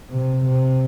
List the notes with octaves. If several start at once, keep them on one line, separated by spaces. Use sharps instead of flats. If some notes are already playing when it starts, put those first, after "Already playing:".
C3
C3